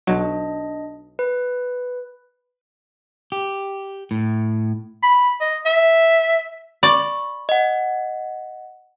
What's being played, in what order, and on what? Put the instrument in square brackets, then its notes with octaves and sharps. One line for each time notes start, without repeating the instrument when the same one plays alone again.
[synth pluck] B1 F#3 [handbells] D4 D#5
[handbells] B4
[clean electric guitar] G4
A2
[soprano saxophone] B5
D#5
E5
[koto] D5 [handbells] B5 C#6
[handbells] D#5 F#5